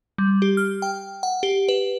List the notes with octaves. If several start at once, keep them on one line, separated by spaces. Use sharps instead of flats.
G3
G4
F6
G5
F#5
G4
B4